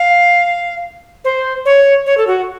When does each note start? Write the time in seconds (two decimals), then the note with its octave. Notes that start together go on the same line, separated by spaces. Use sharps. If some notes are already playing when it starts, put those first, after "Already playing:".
Already playing: F5
1.25 C5
1.65 C#5
2.06 C#5
2.18 A4
2.27 F#4